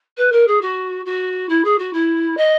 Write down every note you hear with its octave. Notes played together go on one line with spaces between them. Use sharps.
B4
A#4
G#4
F#4
F#4
E4
G#4
F#4
E4
D#5